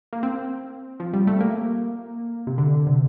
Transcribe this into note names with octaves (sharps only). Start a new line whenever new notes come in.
A#3
C4
F3
G3
A3
A#3
C3
D3
C3